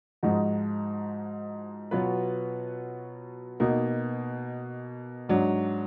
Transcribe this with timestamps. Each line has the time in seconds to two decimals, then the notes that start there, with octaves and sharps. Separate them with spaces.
0.23 G#2 F3 G#3 D#4 F#4
1.91 B2 F#3 B3 F4 B4
3.60 B2 A#3 D#4
5.29 G#2 F#3 D4